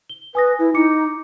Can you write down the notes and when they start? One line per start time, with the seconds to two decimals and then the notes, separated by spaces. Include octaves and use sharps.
0.10 G7
0.35 B4 G#5 D#6 A#6
0.59 E4
0.74 D#4 E4 D6 C#7